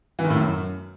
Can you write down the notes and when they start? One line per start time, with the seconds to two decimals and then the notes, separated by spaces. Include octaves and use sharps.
0.19 E3
0.24 D#3
0.30 A2
0.36 F#2